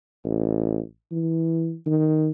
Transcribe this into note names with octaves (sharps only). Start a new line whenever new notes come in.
A1
E3
D#3